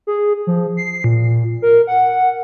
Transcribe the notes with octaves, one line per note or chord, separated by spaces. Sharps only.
G#4
F3
C7
A#2
A#4
F#5